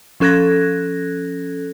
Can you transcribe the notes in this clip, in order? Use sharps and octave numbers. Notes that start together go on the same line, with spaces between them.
F3 C#4 A4 F#6 G#6 A#6